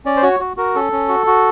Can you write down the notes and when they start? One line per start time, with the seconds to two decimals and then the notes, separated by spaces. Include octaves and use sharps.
0.05 C#4 D5
0.17 C5
0.23 F#4 C#5
0.40 F#4
0.57 F#4 A#4
0.75 C#4 A4
0.92 C#4
1.08 F#4
1.27 F#4